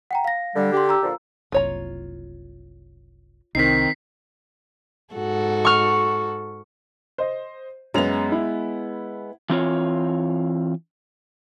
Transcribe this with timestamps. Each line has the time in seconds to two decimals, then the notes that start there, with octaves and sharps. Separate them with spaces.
0.11 F#5 G5 A#5
0.25 F5 A#6
0.56 D3 G3
0.73 D4 G4 C6
0.89 A#5 E6
1.03 A#2 D3 F3
1.52 F#1 C2 F4 C#5 A#5
3.55 C2 D#3 C4 D#4 B6 C7
5.14 G#2 F#4 A4
5.65 C#6 F6
7.18 C5 D#5
7.94 F#2 G#3 B3 C#4 F7
8.32 E4
9.50 E3 C4 F4 C#5